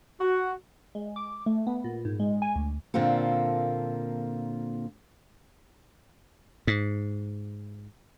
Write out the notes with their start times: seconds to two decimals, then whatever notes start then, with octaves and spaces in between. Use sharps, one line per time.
0.21 F#4
0.95 G#3
1.16 D6
1.46 A3
1.67 B3
1.84 A#2
2.05 G#2
2.20 G#3
2.42 G#5
2.56 D2
2.94 A#2 D3 A#3 C4 F4 A4
6.67 G#2